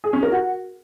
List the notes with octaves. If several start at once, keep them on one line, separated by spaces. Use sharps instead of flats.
G#4
C#4
A#4
F#4